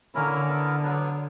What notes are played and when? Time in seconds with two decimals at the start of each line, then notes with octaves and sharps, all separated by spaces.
0.14 D3 A#3 C#4 E4 A#4
0.48 B3 E4 A#4
0.82 F#3 B3 D4